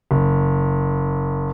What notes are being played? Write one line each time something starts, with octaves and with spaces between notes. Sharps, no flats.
F#1